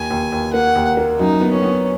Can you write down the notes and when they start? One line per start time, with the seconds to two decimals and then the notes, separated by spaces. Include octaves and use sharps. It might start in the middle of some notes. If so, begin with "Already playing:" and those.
Already playing: D#2 G#5
0.10 D#2
0.32 D#2
0.54 A#3 F#5
0.75 D#2
0.97 A#3
1.19 F#2 D#4
1.41 B3
1.52 C#4
1.63 B3